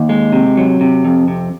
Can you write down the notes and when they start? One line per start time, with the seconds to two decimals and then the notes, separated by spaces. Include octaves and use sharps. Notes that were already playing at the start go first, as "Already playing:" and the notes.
Already playing: D#2
0.09 G#3
0.32 C3
0.57 F#3
0.81 C3
1.05 F2
1.28 C3